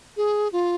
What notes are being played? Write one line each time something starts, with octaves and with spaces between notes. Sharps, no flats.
G#4
F4